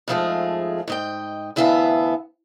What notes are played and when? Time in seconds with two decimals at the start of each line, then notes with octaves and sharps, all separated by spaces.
0.08 F2 G#2 F3 G#3 A3 G#4
0.88 G#2 D#5 G5
1.56 D2 E3 B3 E5 F5 A5